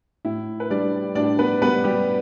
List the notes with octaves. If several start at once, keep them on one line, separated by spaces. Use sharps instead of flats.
A2 E4
B4
G3 D4 D5
A2 D4 D5
B3 B4
G3 B3 B4
G3 G4